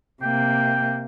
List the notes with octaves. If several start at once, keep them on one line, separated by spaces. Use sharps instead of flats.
C3 A#3 G5